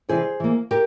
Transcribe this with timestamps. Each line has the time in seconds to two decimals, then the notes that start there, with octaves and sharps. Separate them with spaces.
0.09 C3 E3 G3 G#4 C5
0.40 E3 A#3
0.71 G4 A#4